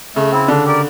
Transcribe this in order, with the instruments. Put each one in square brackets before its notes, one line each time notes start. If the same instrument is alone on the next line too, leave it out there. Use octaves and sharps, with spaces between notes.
[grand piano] C#3 [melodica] A3
[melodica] C4 E4
[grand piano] D3 [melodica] D4
[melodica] G4 A#4 D5